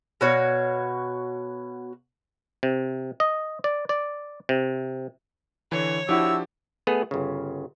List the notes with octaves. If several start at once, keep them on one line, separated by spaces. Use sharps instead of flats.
B2 F#4 C#5 F5
C3
D#5
D5
D5
C3
D3 E3 C#5
F3 D4 E4 F#4 G4 E6
A3 B3 G#4 A4
G1 C#3